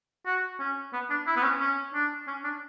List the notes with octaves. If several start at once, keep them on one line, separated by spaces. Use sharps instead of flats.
F#4
C#4
B3
D4
E4
B3
C#4
C#4
D4
C#4
D4